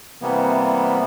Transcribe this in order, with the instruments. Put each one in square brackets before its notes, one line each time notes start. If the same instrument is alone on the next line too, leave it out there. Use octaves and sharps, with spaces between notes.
[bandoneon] C3 E3 G3 A#3 B3